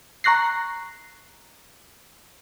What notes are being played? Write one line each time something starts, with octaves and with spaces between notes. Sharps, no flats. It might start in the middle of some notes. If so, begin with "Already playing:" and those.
A#5 C#6 F#6 A#6 C7